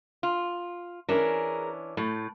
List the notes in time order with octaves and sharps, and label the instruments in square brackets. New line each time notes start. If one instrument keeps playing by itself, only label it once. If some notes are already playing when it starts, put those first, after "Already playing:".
[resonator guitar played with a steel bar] F4
[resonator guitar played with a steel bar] E3 C#4 D4 [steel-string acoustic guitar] G#4 A#4
[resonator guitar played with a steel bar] A2 [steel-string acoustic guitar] A3